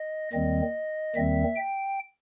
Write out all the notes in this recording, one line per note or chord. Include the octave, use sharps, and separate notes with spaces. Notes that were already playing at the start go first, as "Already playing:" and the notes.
Already playing: D#5
D#2 D#3 G3 C4 D#5
D#2 D#3 G3 C4 E5
G5